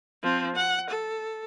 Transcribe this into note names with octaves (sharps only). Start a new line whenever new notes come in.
F3 C4
F#5
A4